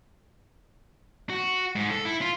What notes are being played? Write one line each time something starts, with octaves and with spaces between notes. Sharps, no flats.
F#4
G#2
A4
E4
F4